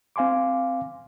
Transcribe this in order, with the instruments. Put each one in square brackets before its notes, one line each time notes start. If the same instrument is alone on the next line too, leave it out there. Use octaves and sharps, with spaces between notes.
[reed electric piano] C4 F5 G#5 C6 D6